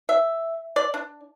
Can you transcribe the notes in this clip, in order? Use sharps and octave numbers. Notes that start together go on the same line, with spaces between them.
E5
D5
D4